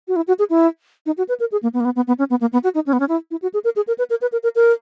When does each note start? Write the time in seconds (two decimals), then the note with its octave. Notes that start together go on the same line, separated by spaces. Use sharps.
0.08 F#4
0.16 E4
0.28 F#4
0.39 G#4
0.50 E4
1.06 D#4
1.18 F#4
1.29 B4
1.40 A#4
1.52 G#4
1.63 A#3
1.74 B3
1.80 A#3
1.85 B3
1.96 B3
2.07 B3
2.19 C#4
2.30 B3
2.41 A#3
2.53 B3
2.64 F#4
2.75 D#4
2.87 C#4
2.93 B3
3.00 C#4
3.09 E4
3.31 E4
3.42 F#4
3.54 G#4
3.64 A#4
3.76 G#4
3.88 A#4
3.98 B4
4.10 A#4
4.22 B4
4.32 A#4
4.43 A#4
4.55 A#4